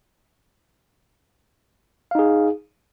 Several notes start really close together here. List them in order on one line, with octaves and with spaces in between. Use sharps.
F5 D#4 G#4